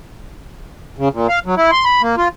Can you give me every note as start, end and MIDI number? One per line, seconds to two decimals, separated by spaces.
0.98 1.08 49
1.13 1.27 46
1.29 1.39 77
1.45 1.55 54
1.57 1.71 64
1.71 1.85 84
1.85 2.02 83
2.02 2.16 58
2.17 2.28 65